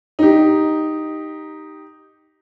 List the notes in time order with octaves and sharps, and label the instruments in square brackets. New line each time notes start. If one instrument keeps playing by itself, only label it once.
[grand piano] D#4 G4